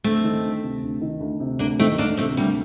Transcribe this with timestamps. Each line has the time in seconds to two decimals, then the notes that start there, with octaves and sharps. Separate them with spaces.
0.04 D2 A3 C4
0.24 D#3
0.43 D2
0.63 C3
0.83 D2
1.01 D#3
1.20 D2
1.40 C3
1.59 D2 A#3 D4
1.79 D#3 A3 C4
1.98 D2 A#3 D4
2.17 C3 A3 C4
2.37 D2 G3 A#3